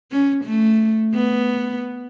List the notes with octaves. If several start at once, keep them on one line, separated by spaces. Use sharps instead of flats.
C#4
A3
B3